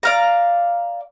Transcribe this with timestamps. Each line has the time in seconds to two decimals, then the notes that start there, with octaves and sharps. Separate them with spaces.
0.03 D5 F5 A#5